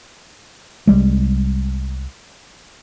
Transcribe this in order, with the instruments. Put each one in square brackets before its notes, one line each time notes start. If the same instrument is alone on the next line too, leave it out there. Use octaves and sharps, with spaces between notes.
[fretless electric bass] C2 G3 G#3